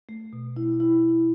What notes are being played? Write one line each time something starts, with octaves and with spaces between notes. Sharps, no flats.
A3
B2
E4
E4